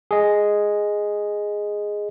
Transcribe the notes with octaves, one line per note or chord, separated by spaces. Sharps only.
G#4 D#5